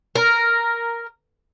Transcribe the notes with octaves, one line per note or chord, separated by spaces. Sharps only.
A#4